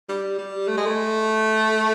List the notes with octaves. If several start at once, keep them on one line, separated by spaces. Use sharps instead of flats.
G3
G3
A3
G#3
A3